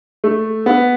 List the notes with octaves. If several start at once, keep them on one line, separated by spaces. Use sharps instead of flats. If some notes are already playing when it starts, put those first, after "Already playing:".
A3
B3